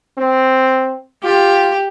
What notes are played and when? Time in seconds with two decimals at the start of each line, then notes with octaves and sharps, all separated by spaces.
0.18 C4
1.24 F4 G4